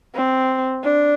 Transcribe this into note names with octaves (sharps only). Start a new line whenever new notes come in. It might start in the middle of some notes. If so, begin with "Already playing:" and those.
C4
D4